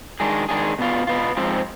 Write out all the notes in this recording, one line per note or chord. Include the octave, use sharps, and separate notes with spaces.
D#3 G#3 D4 G#4
D#3 G#3 D4 G#4
B2 B3 F4
B2 B3 F4
G#2 F3 C4